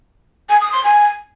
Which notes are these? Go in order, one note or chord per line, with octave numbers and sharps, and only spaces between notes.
G#5
D#6
C6
G#5